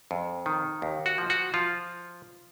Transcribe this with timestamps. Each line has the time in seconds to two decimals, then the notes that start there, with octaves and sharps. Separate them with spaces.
0.11 F2
0.46 D#3
0.82 D#2
1.06 F#4
1.18 F3
1.30 F#4
1.54 F3 F4